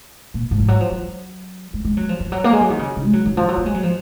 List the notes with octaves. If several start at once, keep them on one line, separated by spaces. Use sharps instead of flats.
A#2
G#2
F3
F#3
F3
F#3
G#3
G#3
F#3
F3
F3
F#3
A#3
G#3
F#3
D#3
C#3
C#3
G#3
F#3
D#3
F3
F#3
A#3
G#3
F#3
F3